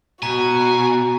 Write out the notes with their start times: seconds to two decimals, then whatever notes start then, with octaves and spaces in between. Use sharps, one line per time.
0.23 B2 F#4 G#5 A#5